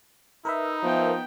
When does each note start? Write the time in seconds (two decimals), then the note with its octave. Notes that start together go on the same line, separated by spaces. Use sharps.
0.45 D#4 A#4 B4 E5
0.83 F3 B3 G5